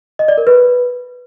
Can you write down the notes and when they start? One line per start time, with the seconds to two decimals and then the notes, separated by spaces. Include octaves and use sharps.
0.19 D#5
0.28 D5
0.38 A#4
0.47 B4